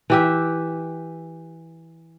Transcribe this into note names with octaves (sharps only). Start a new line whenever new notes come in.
E3 G4 E5